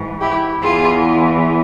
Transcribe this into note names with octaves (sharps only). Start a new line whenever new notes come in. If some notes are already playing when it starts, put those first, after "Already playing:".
Already playing: G#2 E3
E4 G4
E2 E3 F4 G#4